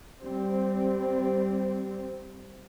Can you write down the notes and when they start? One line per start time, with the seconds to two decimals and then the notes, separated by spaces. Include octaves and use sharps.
0.22 G3 C4